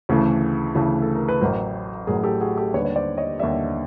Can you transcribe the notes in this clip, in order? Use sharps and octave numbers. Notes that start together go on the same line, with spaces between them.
D2 C#3 E3 A3
D2 C#3 E3 A3
A4
A#4
B4
A1 A2 F#3 A#4 C5
A1 A2 F#3 G#4 A#4
G4 A4
F#4 G#4
G4 A4
D#2 D3 G3 B4 C#5
C#5
C5 D5
C#5 D#5
D#2 D3 G3 D5 E5